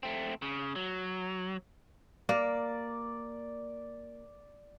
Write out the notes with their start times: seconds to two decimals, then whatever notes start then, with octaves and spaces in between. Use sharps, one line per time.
0.03 A3 C4
0.42 C#3
0.76 F#3
2.29 A#3 D5